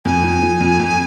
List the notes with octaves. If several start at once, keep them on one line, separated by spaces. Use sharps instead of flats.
F2 G#5
F3
F3
F2
F2